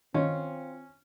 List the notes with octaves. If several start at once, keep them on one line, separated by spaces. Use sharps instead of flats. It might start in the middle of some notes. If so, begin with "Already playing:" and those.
D#3 C4 C#4 F4